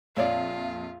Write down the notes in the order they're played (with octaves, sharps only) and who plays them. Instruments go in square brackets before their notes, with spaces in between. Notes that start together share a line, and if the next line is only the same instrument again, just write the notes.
[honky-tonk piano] A#1 F2 [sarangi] F4 [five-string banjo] A4 C#5 D5 [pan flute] F5